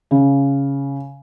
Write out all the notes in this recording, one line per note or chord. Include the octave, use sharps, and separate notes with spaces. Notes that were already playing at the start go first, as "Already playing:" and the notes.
C#3